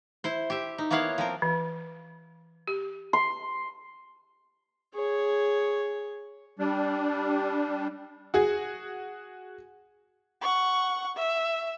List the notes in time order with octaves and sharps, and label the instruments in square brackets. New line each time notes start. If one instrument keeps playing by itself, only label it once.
[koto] E4 C5
G4 E5
D#4
A#3 B3 E4 C#5 F5 F#5
F3 C4 A#4
[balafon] E3
G4
[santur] C6
[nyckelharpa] G#4 C#5
[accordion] G3 D4
[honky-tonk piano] F#4 G#4
[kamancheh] F#5 C#6
E5